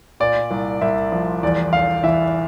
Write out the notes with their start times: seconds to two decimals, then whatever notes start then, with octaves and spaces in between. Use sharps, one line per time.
0.20 A#2 D5
0.51 C2
0.81 C2 E5
1.12 F3
1.43 E2 D5
1.73 F1 F5
2.03 E3 E5